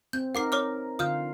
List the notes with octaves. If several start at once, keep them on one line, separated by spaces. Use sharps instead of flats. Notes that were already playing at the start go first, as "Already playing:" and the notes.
C4 G6
D#4 A#4 F#5 D6 C7
C#5 D6 F6
D3 F4 F5 D#6 F6 G6